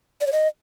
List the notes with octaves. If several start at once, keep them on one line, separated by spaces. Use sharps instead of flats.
D5
C#5
D#5